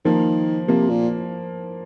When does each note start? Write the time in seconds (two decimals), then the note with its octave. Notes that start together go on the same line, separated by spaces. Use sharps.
0.05 D#3 F3 A#3
0.68 C3 F3 A#3
0.89 A#2